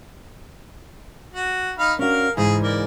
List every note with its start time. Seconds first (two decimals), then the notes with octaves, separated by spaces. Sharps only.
1.34 F#4
1.79 D#4 F5 B5
1.99 C#4 D4 F#4 A#4 F5
2.37 G#2 C#3 E3 G#4
2.63 A#3 D5